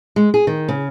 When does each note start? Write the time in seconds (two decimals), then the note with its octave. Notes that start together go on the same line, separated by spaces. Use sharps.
0.16 G#3
0.34 G#4
0.47 D#3
0.68 C#3